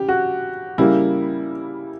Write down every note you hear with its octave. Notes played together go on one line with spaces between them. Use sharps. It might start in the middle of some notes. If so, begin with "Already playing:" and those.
Already playing: C#3 G4
F#4
C#3 G3 A#3 E4